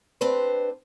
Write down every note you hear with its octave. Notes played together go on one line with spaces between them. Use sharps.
C4 D4 G4 B4 C5